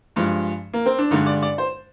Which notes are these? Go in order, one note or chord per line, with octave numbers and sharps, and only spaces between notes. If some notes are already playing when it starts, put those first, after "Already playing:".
G2 F3 G#3
A#3
C4
D4
G2 D3 G#3 D#4
D5
D5
C5